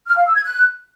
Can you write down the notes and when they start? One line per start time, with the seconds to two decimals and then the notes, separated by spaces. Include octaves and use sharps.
0.08 F6
0.17 F5
0.26 E6
0.35 G#6
0.44 F#6